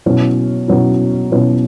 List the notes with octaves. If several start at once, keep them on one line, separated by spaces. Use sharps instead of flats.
B2 F#3 C#4 E4
B2 F#3 C#4 E4
B2 F#3 C#4 E4